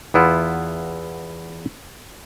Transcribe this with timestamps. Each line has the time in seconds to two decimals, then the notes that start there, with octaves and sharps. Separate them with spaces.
0.14 E2 B3 E4 F4